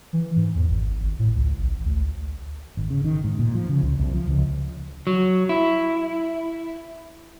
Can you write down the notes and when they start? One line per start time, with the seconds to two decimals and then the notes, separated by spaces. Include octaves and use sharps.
0.13 E3
0.36 G#2
0.55 E2
0.69 G#1
1.03 G#1
1.19 A2
1.35 C#2
1.59 A1
1.85 D2
2.77 G#1
2.90 C#3
3.04 D#3
3.24 G#2
3.39 A#2
3.55 F3
3.69 C#3
3.82 C#2
3.99 C2
4.14 F3
4.28 C#2
5.07 F#3
5.49 E4